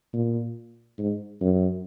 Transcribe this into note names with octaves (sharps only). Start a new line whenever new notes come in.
A#2
G#2
F#2